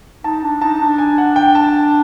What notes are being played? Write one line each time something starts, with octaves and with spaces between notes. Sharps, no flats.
D#4 A5
D4
D#4 A5
D4
G#5
F#5
G5
A5